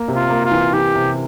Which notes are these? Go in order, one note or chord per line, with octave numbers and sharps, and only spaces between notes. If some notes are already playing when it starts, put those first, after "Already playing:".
Already playing: A#3
C3
F4
A#3
F4
E3
E3 G4
C3